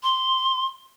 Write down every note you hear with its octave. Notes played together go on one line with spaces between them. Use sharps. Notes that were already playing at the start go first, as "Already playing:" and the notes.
C6